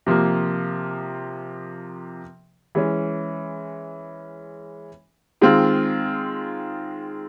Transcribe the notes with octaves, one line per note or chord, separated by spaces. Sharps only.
C3 F3 A#3
E3 G#3 C#4
D#3 G#3 C4 F4